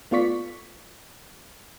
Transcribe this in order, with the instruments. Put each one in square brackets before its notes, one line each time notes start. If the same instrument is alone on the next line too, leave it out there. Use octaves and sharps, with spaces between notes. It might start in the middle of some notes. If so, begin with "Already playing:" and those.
[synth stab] A3 B3 F4 D5 C#6 B6